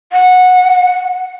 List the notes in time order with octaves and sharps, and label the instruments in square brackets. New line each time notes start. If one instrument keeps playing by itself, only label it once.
[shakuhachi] F#5